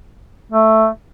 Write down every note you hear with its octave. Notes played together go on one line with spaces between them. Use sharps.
A3